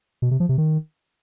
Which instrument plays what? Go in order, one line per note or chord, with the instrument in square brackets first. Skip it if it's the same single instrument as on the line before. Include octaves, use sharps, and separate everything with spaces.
[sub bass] B2
C3
F3
C3
D#3